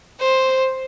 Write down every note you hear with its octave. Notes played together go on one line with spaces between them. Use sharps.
C5